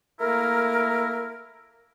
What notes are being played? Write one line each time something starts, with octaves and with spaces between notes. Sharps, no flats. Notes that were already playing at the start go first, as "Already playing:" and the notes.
A3 A#3 E4 A#4